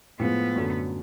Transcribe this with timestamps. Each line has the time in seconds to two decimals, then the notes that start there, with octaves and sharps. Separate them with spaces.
0.19 A2 F3 G#3 B3
0.56 F#2 D3 F#3 A3